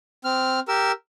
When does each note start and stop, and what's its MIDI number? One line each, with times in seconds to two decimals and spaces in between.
0.25 0.60 60
0.25 0.60 89
0.68 0.92 67
0.68 0.92 70
0.68 0.92 88